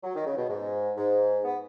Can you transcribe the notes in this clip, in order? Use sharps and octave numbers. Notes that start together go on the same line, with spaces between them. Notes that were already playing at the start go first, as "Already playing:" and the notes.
F#3
D#3
C#3
B2
G#2
G#2
B3